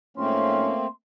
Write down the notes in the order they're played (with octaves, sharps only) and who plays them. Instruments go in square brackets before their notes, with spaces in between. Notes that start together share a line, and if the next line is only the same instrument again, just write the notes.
[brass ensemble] G#2 F3 C#4 [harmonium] A3 A#3 C4 [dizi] C6